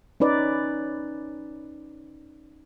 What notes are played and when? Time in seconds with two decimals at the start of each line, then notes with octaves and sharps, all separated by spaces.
0.20 C#4 D#4 B4 D5